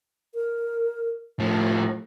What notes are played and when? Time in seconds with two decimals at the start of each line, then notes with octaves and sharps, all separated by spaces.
0.34 A#4
1.40 A2 F3 A3